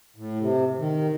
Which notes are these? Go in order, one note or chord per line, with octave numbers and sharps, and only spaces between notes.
A2
C3
D#3